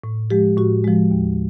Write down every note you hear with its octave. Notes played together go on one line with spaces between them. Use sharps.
A2
F3 G#3 G4
A2 F#4
F3 G#3
D#2